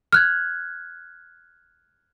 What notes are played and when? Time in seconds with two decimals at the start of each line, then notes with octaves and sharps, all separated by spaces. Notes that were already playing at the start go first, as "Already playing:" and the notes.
0.13 F6 F#6 G#6